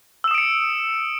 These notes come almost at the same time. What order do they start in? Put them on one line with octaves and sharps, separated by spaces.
E6 E7 D#6 D7 C#7